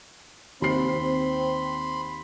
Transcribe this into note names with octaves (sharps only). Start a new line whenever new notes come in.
D#2 C4 B5 C6 C7